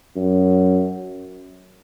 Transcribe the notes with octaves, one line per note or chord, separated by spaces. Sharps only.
F#2